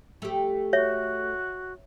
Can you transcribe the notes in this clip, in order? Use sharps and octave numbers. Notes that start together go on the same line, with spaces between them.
A3 G4
F#4 C#5 E5